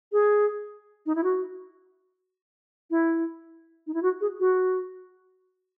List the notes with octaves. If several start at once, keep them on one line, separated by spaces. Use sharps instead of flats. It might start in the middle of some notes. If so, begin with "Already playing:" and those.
G#4
D#4
E4
F#4
E4
D#4
E4
F#4
G#4
F#4